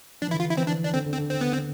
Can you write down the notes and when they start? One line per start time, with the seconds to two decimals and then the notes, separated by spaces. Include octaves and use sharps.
0.22 F3 D4
0.28 E3
0.31 D3 E4
0.40 F4
0.50 E4
0.57 E3 C4
0.67 D4
0.85 D4
0.94 D3 C4
1.06 D3
1.12 C4
1.19 D3
1.30 C4
1.41 B3
1.53 C4